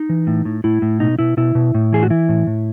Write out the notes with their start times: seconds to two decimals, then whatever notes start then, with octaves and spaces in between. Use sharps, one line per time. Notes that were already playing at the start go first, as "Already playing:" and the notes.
Already playing: D#4
0.09 E3
0.27 A2
0.45 A2
0.64 A2 E4
0.82 A2
1.00 B2 D#4
1.19 B2 E4
1.37 B2 E4
1.55 B2
1.74 A2
1.93 E3 G#4
2.03 F#4
2.10 E3 E4
2.29 A2
2.47 A2